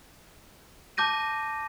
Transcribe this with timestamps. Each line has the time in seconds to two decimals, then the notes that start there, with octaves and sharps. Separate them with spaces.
0.97 A5 D6 G6 A#6 D#7